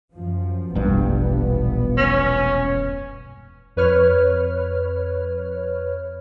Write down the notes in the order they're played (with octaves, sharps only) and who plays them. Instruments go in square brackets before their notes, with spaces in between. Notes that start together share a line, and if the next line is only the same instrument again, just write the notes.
[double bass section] F#2 F3
[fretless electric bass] E1 G2 [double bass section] A#1 B3
[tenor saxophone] C#4
[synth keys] F2 B4 C#5 F6